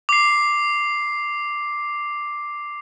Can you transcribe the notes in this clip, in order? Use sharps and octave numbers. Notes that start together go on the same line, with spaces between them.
D6 C7